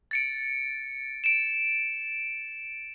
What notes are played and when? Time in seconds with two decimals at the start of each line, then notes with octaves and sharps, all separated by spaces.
0.11 A6 C#7 D7
1.24 D7 E7